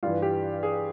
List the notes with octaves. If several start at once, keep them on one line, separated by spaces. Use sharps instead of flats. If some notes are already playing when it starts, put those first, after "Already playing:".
G2 E3 F4
G4
G#4